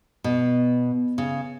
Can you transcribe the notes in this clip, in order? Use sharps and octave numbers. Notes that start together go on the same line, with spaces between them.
B2
C#3